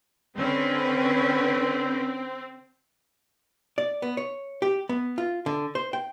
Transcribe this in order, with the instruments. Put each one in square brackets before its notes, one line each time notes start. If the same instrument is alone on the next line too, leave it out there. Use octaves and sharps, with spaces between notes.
[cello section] D3 C#4 B4 [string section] C4
[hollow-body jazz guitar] D5
B3
C#5
G4
B3
F4
D3
C5
G5